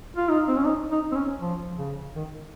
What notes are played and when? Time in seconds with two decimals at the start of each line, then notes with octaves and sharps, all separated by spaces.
0.17 F4
0.29 D#4
0.48 C4
0.57 C#4
0.66 D#4
0.91 D#4
1.12 C4
1.15 C#4
1.41 F3
1.78 C#3
2.15 D#3